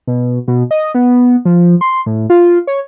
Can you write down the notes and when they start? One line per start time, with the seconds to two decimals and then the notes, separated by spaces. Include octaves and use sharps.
0.07 B2
0.48 B2
0.71 D#5
0.94 B3
1.45 F3
1.81 C6
2.06 A2
2.30 F4
2.67 C#5